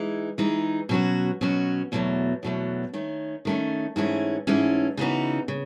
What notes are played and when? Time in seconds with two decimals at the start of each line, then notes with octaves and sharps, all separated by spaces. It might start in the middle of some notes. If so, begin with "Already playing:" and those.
Already playing: E3 G#3 D#4 G#4
0.38 E3 G#3 D#4 G#4
0.89 B2 F#3 C#4 F#4
1.41 B2 F#3 C#4 F#4
1.92 E2 B2 F#3 A3
2.43 E2 B2 F#3 A3
2.94 D#3 A3 C#4
3.45 D#3 A3 C#4
3.96 G#2 E3 A3 C#4 G#4
4.47 G#2 E3 A3 C#4 G#4
4.97 C#3 E3 B3 D#4 F#4
5.48 C#3